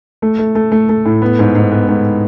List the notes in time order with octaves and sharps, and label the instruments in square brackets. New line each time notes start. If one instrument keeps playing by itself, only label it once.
[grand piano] A3
A3
A3
A3
A3
A2
B3
G#2
G#2
B3
G#2